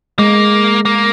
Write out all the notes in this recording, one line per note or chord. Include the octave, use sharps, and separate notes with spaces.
G#3 A#3
A#3